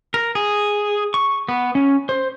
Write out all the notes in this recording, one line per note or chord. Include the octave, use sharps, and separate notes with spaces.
A#4
G#4
C#6
B3
C#4
C5